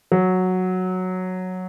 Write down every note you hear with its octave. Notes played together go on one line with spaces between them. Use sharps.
F#3